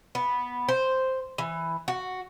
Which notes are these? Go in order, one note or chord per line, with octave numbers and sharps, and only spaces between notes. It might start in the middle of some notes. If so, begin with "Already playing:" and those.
B3
C5
E3
F#4